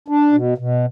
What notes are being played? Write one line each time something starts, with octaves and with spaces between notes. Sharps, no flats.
D4
B2
B2